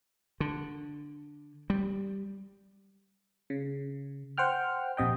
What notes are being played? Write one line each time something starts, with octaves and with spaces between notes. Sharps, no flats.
D3
G3
C#3
C5 F#5 G5 F6
A#1 C3 D#5 G5